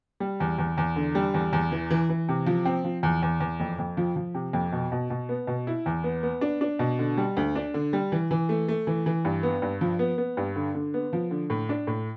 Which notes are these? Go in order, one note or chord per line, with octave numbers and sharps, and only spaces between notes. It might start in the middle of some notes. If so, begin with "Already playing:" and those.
G3
E2
E2
E2
D3
G3
E2
E2
E3
E3
E3
C3
F3
C4
F3
E2
E2
E2
F2
F2
F3
F3
C3
F2
B2
B2
B2
B3
B2
E4
E2
B3
B3
D4
D4
B2
D3
G3
D2
D4
D3
G3
E3
E3
A3
A3
E3
E3
G2
B3
G2
F3
B3
B3
G2
D3
D3
B3
F3
D3
A2
D4
A2